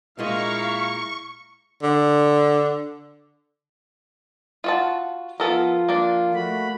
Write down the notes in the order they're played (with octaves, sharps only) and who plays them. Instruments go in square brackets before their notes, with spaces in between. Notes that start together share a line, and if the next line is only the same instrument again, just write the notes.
[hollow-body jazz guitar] A#2 G#3 D#5 [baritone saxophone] E4 [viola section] F5 A#5 [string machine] C#6
[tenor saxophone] D3
[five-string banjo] F4 F#4 A5
[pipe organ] F3 F4 [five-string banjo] B3 A4 A#4
[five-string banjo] A#3 D4
[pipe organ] A3 F#4 B5